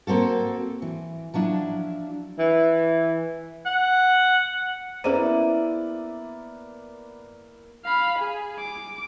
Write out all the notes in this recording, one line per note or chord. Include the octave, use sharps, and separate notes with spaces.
A#3 C4 F#4 A4
E3
F3 F#3 D4 E4
E3
F#5
A#3 B3 C#4 E4 G#4 C5 D5 D#7
F5 B5
G#4
D6